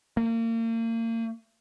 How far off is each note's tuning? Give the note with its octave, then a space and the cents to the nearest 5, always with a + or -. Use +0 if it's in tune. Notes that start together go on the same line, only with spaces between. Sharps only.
A#3 -35